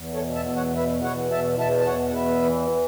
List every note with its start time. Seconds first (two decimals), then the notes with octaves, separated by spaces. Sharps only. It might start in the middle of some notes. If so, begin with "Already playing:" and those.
Already playing: E2
0.14 A4 C#5
0.21 B2
0.35 E5 A5
0.49 E2
0.56 C#5 F#5
0.76 B2 B4 E5
1.04 E2 C#5 F#5
1.31 B2 E5 A5
1.59 E2 E5 A5
1.80 A5
1.87 B2 C#5 F#5
2.09 F#5
2.14 E2 B4 E5
2.42 E3